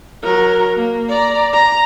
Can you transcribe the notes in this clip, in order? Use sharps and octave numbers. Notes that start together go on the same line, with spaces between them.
F#3 A#4
A#3
D5 A#5
A#5